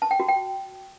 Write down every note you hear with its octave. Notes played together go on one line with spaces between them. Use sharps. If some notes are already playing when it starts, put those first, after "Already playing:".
A5
G5
F#4
G5